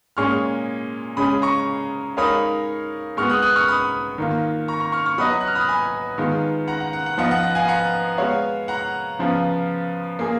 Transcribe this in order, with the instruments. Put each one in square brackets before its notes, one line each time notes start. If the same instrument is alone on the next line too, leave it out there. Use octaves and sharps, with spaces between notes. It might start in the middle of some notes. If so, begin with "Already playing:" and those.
[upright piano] A#2 G#3 C#4 G#4 [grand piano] C#6 F6
[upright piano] C#3 G#3 C#4 G#4 [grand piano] B5 D#6
[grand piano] A#5 C#6
[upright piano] G#3 D#4 A#4 C#5 F5 [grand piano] B5 D#6
[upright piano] G#3 B3 F#4 [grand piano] C#6 F6
[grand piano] D#6 F#6
D#6 F#6
C#6 F6
B5 D#6
[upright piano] D#3 A#3 F4
[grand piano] A#5 C#6
A#5 C#6
C#6 F6
C#6 F6
[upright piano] F#3 B3 F#4 B4 D#5 [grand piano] B5 D#6
[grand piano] F#6
F6
B5 D#6
G#5 B5
[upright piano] D#3 G#3 B3 F4
[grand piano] F#5 A#5
F#5
F#5
F#5
[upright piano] F3 B3 F4 B4 D#5 [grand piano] F#5
[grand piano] F#5
F#5
F5 G#5
F#5 A#5
[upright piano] G#3 B3 F#4 C#5 F5
[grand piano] F#5 A#5
[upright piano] C#3 F3 B3 F4
A#3 F4 G#4